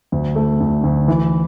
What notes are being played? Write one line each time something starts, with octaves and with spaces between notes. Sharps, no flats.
D2
A3
D2
D2
E3